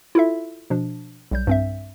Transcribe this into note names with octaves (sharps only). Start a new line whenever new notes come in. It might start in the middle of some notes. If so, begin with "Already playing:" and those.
E4 F4 A4 E5
B2 F3 D4
B1 G3 G6
G2 C4 E5